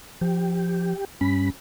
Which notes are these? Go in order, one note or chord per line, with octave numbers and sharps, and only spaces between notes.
F3 G4
G2 C#4 B5